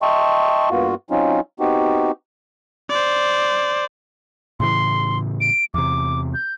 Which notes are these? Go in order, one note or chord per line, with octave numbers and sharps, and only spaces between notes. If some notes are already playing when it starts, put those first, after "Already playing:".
D#5 E5 G5 A5 C6 C#6
G2 A#3 B3 F4 F#4
F#3 C4 C#4 D#4 F4
B3 C4 D#4 F#4 G4
C5 D5
A2 C#3 E3 C6
D7
E2 C3 D6
G6